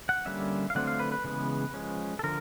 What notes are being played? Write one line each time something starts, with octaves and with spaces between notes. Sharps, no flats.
F#5
D3 G3 A#3 C#4 E5
F5
D3 F#3 A3 C4 F#5
F5
B4
B4
C#3 E3 G#3 B3
F3 G#3 C#4
A4
D3 F3 A#4